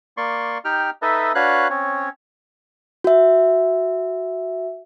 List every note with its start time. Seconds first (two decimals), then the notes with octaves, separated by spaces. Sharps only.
0.17 A#3 D5 C6 C#6
0.65 D#4 G4 G5 F6
1.02 D#4 A4 B4 D#5 E5
1.35 D4 F#4 B4 C#5 F5 F#6
1.70 C4 C#4 C#5
3.04 F#4 E5